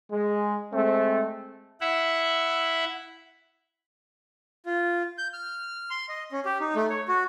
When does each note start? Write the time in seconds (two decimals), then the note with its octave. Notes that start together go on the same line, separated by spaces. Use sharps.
0.11 G#3
0.73 G#3 A3 C4
1.81 E4 E5 F#5
4.66 F4
5.18 G6
5.33 F6
5.90 C6
6.09 D#5
6.32 C#4
6.46 G4
6.60 D#4
6.76 A3
6.90 C#5
7.08 F#4